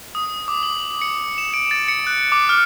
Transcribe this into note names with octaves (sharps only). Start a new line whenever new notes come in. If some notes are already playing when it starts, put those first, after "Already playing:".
D#6
D6
F#7
C#7
E7
D7
A6
C#7
F#6
D6
F6